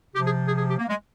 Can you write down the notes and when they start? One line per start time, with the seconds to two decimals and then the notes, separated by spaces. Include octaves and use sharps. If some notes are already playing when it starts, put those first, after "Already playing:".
0.15 C3 F3 G4
0.25 G#4
0.48 G#4
0.58 G#4
0.69 G4
0.78 A#3
0.89 G#3